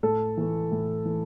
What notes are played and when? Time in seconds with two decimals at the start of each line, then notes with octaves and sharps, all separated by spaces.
0.03 A2 A4
0.37 E3 A3
0.72 A2
1.05 E3 A3